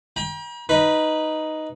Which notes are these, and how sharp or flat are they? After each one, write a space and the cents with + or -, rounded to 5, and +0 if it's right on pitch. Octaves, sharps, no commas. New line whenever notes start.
G5 +25 A#5 +45
D#4 +0 B4 +0 B5 -15